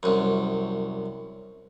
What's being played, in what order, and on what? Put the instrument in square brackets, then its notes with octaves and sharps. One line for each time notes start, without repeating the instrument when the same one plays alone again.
[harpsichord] C2 F#2